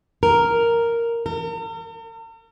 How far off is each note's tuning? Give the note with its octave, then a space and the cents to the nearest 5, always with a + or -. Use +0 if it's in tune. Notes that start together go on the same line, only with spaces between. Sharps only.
A#4 -5
A#4 -45